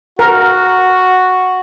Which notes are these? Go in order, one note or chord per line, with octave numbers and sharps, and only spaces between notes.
F#4 A#4